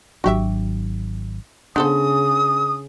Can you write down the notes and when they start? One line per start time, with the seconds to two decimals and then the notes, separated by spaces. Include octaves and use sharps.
0.24 G#1 F#3 D4 F#4 G4 E5
1.76 C#3 B3 D4 A4 C5 D#6